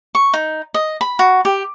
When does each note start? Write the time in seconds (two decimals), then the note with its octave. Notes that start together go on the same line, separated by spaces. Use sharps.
0.15 C#6
0.34 D#4
0.74 D#5
1.01 B5
1.19 F#4
1.45 G4